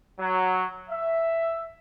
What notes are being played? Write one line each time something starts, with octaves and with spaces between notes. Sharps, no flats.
F#3
E5